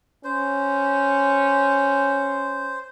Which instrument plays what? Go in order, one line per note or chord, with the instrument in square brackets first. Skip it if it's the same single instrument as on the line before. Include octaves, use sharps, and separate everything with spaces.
[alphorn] C#4 [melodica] C5